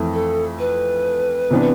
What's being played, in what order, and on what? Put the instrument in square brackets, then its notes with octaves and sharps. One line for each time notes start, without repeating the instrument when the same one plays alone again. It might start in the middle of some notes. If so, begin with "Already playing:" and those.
Already playing: [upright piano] F2 E3 A3
[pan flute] A4
B4
[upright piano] C3 E3 B3 D4